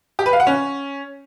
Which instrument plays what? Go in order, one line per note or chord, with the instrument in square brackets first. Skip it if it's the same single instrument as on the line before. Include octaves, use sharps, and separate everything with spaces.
[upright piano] G4
B4
F5
F#5
C#4